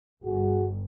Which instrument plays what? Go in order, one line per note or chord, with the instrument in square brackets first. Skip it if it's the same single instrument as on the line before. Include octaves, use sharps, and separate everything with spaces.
[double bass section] G1 [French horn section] F#4 G#4